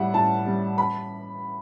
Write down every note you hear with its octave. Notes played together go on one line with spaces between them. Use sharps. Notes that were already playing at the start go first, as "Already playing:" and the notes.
Already playing: A2 G3 E5 F#5
A2 A5
G3
B5